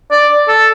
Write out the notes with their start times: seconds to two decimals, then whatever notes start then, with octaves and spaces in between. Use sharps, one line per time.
0.11 D5
0.49 A4